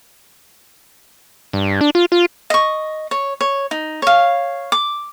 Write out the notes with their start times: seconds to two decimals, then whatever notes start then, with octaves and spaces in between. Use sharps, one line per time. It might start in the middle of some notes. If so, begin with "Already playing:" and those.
1.53 G2
1.81 D4
1.95 F4
2.12 F4
2.50 D#5 C#6
3.11 C#5
3.41 C#5
3.71 D#4
4.02 C#5 F5
4.72 D6